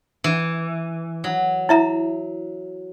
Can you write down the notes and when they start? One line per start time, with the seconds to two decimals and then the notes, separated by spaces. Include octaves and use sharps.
0.24 E3
1.24 F#3
1.69 E4 E5 A#5